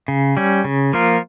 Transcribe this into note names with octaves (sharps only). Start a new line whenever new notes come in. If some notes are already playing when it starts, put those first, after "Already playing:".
C#3
G3 C#4
C#3
F3 A#3 F4 A#4